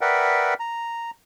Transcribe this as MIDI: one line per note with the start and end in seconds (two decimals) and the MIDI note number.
0.01 0.54 70
0.01 0.54 71
0.01 0.54 74
0.01 0.54 76
0.01 0.54 78
0.01 0.54 79
0.60 1.11 82